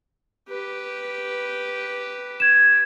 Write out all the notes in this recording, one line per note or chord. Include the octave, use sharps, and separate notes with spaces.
G4 B4
G#6 E7